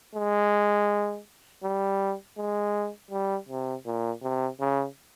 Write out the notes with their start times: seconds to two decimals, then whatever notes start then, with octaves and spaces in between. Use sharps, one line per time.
0.15 G#3
1.64 G3
2.38 G#3
3.11 G3
3.49 C3
3.86 A#2
4.22 C3
4.60 C#3